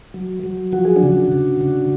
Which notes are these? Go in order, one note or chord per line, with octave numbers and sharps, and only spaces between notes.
F#3
F#3
F3 F#4
G#4
D4 F#4
C#3
C#3
C#3